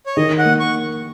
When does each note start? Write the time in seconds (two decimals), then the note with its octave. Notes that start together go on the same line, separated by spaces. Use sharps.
0.06 C#5
0.17 D#3 D#5
0.38 F#5
0.45 A#3
0.60 C#6